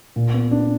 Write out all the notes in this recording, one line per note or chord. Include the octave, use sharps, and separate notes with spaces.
A#2
B3
D4